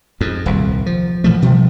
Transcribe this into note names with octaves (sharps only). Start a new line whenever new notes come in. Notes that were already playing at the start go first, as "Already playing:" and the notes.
F2 G#2
D#1 C2
F3
A#2 E3 F3 A3
B2 F3 G3